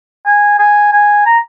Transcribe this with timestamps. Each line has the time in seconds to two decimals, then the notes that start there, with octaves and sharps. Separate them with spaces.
0.26 G#5
0.59 G#5
0.93 G#5
1.26 A#5